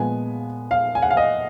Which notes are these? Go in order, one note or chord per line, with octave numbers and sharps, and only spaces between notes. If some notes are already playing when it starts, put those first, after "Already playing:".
Already playing: A#2 F3 G#3 B3 G#5
F5
G#5
F#5
F5
D#5